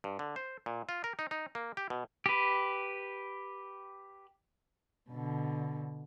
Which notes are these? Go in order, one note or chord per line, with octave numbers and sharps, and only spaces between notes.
G2
D3
C5
A#2
F4
A#4
D#4
D#4
A#3
G4
B2
G4 B4
B2 D3